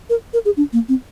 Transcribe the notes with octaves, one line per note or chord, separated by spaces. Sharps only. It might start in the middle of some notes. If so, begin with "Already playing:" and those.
A#4
A#4
G#4
D4
A#3
C4